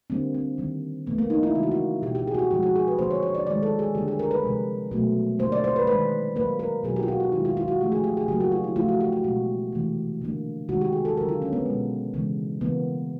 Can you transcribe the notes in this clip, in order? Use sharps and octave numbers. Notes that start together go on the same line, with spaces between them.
D3 G3 A#3 C4
C4
D#3 G3 A#3
A#2 F3 A3 B3
A#3
D#4
E4
C#3 E3 G#3 F4
F#4
F4
B2 G3 A#3 G4
G4
G#4
F#4
G4
A#2 F3 G#3 F#4
F#4
G#4
B4
D3 F3 A#3 C5
C#5
C#5
D5
D#3 G#3 D5
A4
G#4
D3 G3 A#3 G4
G#4
A#4
B4
C3 F3 G#3
B2 F#3 A3
D3 G3 A#3 C5
D5
C5
B4
D#3 G#3 B4
A#2 F#3 A#3 B4
A#4
B2 F#3 A#3 G#4
G4
F4
F#4
F4
D#3 G#3 E4
F4
F4
F#4
C3 F3 A3 G4
G#4
G4
G#4
C#3 F#3 A#3 G4
F#4
F4
E4
C#3 F3 A3 F4
F#4
G4
F#4
B2 G#3 F#4
C3 E3 A3
D3 G3 A#3
C3 D#3 G#3 F#4
G4
G#4
A4
D3 F#3 A#3 A#4
F4
C#4
B3
B2 G#3
C#3 E3 G#3
C#3 E3 G3 A#3 B3